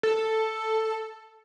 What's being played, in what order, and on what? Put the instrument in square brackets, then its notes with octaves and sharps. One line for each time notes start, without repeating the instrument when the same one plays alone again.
[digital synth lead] A4